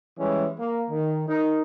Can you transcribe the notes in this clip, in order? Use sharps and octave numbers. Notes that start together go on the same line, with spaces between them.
E3 G3 G#3 C#4
A#3
D#3
D#4 A#4